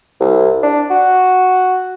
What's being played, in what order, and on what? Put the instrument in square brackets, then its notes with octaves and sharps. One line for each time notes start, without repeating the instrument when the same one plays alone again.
[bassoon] C2
D4
F#4